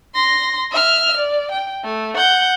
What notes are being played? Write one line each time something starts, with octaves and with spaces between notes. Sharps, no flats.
C6 A#6
E5 F6
D5
G5
A3
F#5 G6